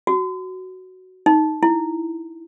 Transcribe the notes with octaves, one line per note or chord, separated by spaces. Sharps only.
F#4
D#4
E4